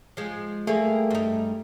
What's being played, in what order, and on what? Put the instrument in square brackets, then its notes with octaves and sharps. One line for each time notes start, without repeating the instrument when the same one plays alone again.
[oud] F3 G#3
[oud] G3 A#3 G#4 [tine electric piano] A3
[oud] G2 D#4